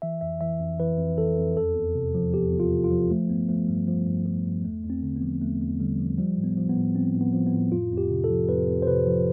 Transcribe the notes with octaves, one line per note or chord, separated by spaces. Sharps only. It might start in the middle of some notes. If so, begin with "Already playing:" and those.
E3 E5
F2 E5
E3 E5
F2
E3 B4
F2
E3 A4
F2
E2 A4
E2
C3
F3
E2 G4
E2
F4
C3
F4
F3
F3 A3
G2 B3
F3 A3
G2 G3
F3
G2
F3
G2
E2 A3
E2
C4
D3
B3
F3
E2 A3
E2
D3 G3
F3
F3 G3
A2
B3
F3
B3
A2
F3 C4
A2
B3
F3
B3
A2
F2 F4
F2
G4
C3
A4
F3
F2 B4
F2
C5
C3 B4
F3